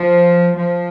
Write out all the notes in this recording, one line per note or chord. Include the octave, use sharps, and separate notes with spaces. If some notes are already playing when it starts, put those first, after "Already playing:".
Already playing: F3
F3